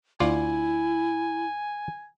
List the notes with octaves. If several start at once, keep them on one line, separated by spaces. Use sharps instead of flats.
D2 E4 F4 D5 G#5